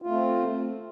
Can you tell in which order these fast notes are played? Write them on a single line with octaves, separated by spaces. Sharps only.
F4 A3 C4